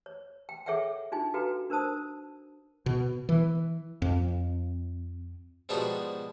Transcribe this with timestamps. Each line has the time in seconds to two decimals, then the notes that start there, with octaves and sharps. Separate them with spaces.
0.06 C#5
0.49 G5
0.66 G#4 A4 C#5 E5 F#5 G5
1.12 D4 D#4 F4 G#5
1.34 F#4 A4 B4 F5 G5 A#5
1.70 D4 A#4 C5 A5 D#6
2.86 B2
3.29 E3
4.02 F2
5.69 G#2 B2 F3 D4 F#4 G4